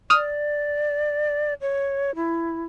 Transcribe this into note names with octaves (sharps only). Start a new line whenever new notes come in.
D5 D#6 F6 D#7
C#5
E4